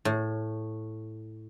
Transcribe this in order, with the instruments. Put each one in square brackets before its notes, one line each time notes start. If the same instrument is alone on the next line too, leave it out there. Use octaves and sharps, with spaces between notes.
[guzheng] A2